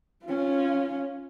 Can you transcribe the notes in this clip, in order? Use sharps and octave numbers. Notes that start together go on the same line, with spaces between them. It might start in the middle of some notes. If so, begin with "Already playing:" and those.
C#4 F4